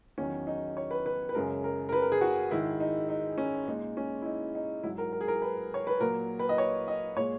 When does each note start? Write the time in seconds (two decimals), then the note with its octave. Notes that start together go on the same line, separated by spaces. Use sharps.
0.18 E2 D#3 F#3 C#4
0.47 D#4
0.77 C#5
0.91 B4
1.06 B4
1.29 B4
1.35 F#2 C#3 G#3 A#4
1.64 A#4
1.89 A#4
1.92 B4
2.02 A#4
2.12 G#4
2.21 F#4
2.51 G#2 D#3 G#3 E4
2.80 D#4
3.09 D#4
3.38 C#4
3.67 A#2 G#3 D#4
3.97 C#4
4.22 E4
4.25 D#4
4.55 D#4
4.83 G#2 F#3 E4
4.98 A#4
5.12 A#4
5.21 G#4
5.28 A#4
5.42 B4
5.74 C#5
5.87 B4
6.00 A#2 F#3 A#4
6.39 B4
6.49 D#5
6.58 C#5
6.88 D#5
7.17 A#2 G#3 C#5